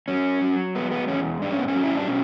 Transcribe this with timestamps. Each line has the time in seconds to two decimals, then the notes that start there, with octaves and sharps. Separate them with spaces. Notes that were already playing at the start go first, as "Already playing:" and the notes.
0.08 F#3 C#4
0.41 F#3
0.75 G#3 B3
0.91 B3
1.08 E2 C#4
1.42 G#2 D4
1.51 C#4
1.59 B3
1.68 C#4
1.75 F#3
1.84 E4
1.95 D4
2.08 B2 C#4